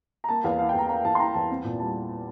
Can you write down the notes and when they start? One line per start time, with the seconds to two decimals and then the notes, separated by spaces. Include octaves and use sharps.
0.24 A#5
0.29 A#3 A5
0.44 E2 F5
0.59 E3 F5
0.69 G5
0.74 E2 A#5
0.89 A#3 A#5
1.04 E2 A5
1.15 C6
1.19 E3 A#5
1.34 E2 A5
1.50 C4
1.64 A#2
1.80 G3 A5